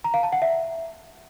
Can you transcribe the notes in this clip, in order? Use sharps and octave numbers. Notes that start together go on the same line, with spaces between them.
A#5
F5
A5
F#5
E5